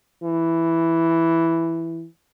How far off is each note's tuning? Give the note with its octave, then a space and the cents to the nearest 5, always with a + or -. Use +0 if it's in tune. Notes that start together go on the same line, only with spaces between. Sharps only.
E3 +5